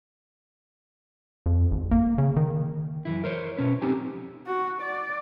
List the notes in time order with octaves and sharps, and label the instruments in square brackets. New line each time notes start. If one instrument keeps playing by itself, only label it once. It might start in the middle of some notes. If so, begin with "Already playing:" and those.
[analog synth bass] F2
G#1
A#3
C#3
D#3
[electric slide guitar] F#2 E3 E4
A#4 C5 C#5
B2 C#4 B4
C4 D#4 G4 G#5
[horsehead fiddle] F#4
D5